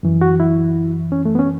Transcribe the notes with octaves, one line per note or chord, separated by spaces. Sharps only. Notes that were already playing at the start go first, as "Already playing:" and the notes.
F#2 E3
F#4
E4
C#4
A3
B3
C#4